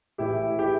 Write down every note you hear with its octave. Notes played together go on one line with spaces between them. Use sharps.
A2 E3 E4 G4
E4 G4